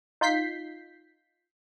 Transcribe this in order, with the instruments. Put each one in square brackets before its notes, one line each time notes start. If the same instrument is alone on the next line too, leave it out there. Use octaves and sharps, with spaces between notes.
[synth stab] D#4 F4 G6 B6 C7